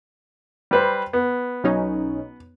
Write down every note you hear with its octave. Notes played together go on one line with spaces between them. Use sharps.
G3 B4 C5
B3
B1 C#4 D#4